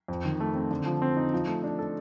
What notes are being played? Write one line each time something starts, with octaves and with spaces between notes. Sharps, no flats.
F2
D#3
A3
C4
D3
F3
C4
D#4
F3
A3
D4
A4